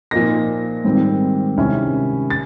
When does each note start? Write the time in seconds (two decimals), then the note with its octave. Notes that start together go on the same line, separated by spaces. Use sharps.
0.11 A#2 F3 A#3 D#4 A#6
0.85 G#2 D#3 G3 C4
1.57 C3 D#3 G#3 C#4 E4
2.30 A6